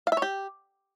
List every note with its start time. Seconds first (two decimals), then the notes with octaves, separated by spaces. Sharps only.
0.07 F5
0.12 E5
0.17 C#5
0.22 G4